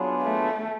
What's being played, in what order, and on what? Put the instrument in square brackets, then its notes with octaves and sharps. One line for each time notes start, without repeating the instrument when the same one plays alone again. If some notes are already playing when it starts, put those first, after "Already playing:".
Already playing: [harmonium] F#3 B3 D4 F4 G#4
[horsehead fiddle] A3